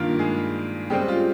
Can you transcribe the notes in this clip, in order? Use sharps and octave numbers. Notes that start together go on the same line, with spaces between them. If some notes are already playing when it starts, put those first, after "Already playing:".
Already playing: G2 D#3 A#3 F4
G#3 G#4
C#3 G3 G#3 C4 G4
F4